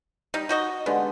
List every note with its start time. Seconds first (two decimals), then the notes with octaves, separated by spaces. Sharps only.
0.34 G3 D#4
0.49 D#4 F#4 D#5
0.86 D3 G#3 B3 G4